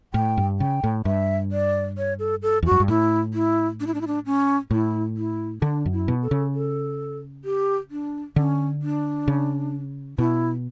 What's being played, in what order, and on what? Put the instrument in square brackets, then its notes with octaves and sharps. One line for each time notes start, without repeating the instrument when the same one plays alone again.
[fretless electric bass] A2 [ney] G5
[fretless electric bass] G2
[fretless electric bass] C#3 [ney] G5
[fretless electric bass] A2
[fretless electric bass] G2 [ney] E5
[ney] D5
C#5
A4
A4
[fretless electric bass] E2
[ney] F#4
[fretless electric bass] F#2
G2
[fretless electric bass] A2 [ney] E4
[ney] E4
D4
E4
D4
E4
D4
C#4
[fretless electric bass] A2 [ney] E4
[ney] E4
[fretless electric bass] D3 [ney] D4
[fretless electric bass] F#2
[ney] E4
[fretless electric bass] B2
[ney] A4
[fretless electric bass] C#3
[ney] A4
G4
D4
[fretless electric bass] D3 [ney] C#4
[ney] D4
[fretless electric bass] C#3
[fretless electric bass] B2 [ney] E4